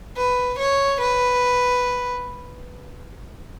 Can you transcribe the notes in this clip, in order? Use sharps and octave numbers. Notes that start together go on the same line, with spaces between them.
B4
C#5
B4